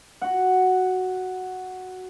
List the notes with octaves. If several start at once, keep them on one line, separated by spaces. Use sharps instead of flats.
F#4 F#5